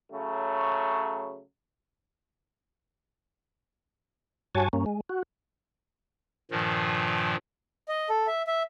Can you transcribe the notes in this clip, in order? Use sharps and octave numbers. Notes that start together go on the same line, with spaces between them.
C#3 F#3 A3
G2 F#4 C#5 G#5 A5
G2 A#3 C#4
G#3
F#4
G2 A#2 D#3 F3
D#5
A4
E5
E5